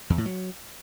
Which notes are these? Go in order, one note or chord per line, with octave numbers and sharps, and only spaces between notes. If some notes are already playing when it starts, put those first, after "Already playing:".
E2
A2
F#3